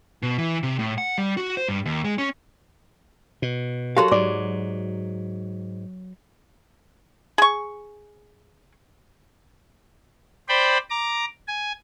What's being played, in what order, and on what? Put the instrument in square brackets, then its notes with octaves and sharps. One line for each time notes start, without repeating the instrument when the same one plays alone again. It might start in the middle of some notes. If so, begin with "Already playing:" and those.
[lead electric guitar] B2
E3
C3
A2
F#5
G3
F#4
C5
G2
D#2
G#3
C#4
[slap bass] B2
[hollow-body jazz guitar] F#3 F#4 F5 [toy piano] G4 C6 [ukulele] A4 A#4
[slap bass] G#2 [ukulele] D5 [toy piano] D6
[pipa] G#4 C#6
[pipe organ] C5 D5 G5 B5
A#5 D6
G#5